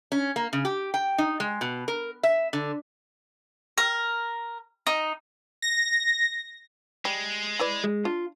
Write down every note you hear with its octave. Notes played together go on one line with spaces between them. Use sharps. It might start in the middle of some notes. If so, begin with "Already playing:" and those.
C#4
A#3
C#3
G4
G5
D#4
G#3
B2
A#4
E5
D3
A#4
D#4
A#6
G3 G#3
E4 B4 D5
G#3
D4 F4